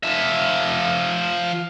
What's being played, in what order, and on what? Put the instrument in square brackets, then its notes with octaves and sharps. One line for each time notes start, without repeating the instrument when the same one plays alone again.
[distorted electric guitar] F3 E5